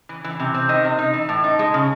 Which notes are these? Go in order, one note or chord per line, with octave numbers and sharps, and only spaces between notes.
E3
E3
C3
C4
D#3 D#5
C3
D#4
E3
A2
D#4
G#3
C#3